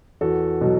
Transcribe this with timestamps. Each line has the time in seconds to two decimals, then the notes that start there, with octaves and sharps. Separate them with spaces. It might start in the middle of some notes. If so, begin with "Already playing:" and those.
0.21 E2 F#4 A4
0.61 B2 F#3